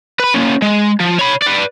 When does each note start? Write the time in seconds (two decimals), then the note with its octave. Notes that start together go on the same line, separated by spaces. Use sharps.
0.20 B4 B5
0.34 A#3 C#4
0.62 G#3
1.00 F3
1.19 C#5 B5
1.42 B4 D5